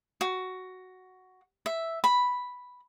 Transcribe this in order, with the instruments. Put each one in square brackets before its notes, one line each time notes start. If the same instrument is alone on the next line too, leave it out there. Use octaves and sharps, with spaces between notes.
[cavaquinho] F#4
E5
B5